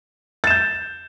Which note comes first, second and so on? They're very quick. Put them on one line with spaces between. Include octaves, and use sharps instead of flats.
A6 E7 G6